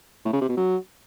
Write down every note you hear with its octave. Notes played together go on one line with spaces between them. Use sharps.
A2
C#3
C3
B2
F#3